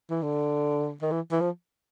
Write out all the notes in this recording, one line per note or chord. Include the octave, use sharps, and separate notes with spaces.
E3
D3
D#3
E3
E3
F3